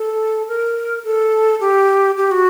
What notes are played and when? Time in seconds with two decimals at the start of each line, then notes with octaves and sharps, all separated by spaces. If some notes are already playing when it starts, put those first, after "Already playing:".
Already playing: A4
0.48 A#4
1.04 A4
1.61 G4
2.17 G4
2.31 F#4